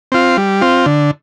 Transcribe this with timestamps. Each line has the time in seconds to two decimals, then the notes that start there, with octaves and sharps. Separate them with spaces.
0.12 C4 F4
0.37 G3
0.61 C4 F4
0.86 D3